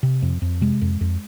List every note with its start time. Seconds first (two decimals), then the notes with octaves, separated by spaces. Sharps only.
0.03 C3
0.22 F2
0.42 F2
0.61 C3 G#3
0.81 F2
1.01 F2